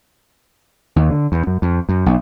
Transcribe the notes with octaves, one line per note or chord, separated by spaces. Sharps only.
D#2
D3
E2
F#2
F2
F#2
B1